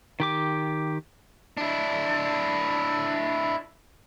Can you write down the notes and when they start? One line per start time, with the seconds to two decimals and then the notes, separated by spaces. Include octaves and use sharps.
0.20 D#3 G4 D6
1.57 D4 E4